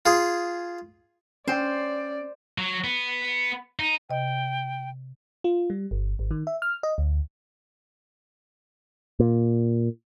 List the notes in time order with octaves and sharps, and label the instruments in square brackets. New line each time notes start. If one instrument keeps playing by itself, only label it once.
[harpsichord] F4 G#4
[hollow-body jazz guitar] C#4 G5 [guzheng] C5 [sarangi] D5
[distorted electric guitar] F#3
B3
D#4
[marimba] C3 D#5 [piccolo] G5
[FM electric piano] F4
G3
G1
G#1
D#3
E5
F6
D#5
D2
[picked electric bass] A#2